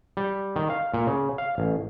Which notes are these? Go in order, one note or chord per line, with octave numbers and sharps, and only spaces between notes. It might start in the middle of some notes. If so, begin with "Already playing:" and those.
G3
D#3
F5
A#2
C#3
F5
A1